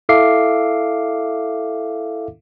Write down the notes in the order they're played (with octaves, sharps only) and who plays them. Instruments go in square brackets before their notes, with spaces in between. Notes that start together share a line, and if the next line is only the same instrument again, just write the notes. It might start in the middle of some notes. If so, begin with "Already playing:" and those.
[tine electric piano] E4 A4 E5 F5 D6 C7